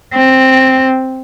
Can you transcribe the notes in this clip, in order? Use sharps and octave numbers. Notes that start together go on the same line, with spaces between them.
C4